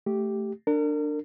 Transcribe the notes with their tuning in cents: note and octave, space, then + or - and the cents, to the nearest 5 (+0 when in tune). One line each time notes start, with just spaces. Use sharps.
A3 +0 G4 +0
D4 +10 A#4 -35